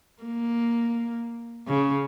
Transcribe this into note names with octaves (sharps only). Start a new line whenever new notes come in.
A#3
C#3